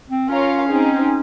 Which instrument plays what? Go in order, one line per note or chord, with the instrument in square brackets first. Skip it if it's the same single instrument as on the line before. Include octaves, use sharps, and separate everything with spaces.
[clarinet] C4
[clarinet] C#4 [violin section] F4 A#4 C#5 F5
[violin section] C4 D#4 G#4